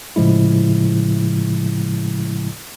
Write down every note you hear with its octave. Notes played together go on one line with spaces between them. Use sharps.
A2 C#3 F3 G#3 E4